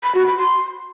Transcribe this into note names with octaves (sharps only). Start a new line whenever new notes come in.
B5
F#4
B5
C6